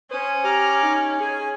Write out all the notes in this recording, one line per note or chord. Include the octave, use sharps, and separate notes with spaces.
C#4 C5 D#6
G4 A#5 D6 F6
D#4
G#4 G#5